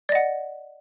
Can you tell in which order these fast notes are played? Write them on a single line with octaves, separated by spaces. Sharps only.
D5 D#5 F#5